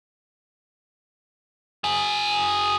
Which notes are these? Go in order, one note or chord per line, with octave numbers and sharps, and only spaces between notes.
F#4 G#4